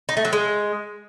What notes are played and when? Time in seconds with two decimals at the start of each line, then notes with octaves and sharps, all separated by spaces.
0.09 D#4
0.17 A3
0.25 F#3
0.33 G#3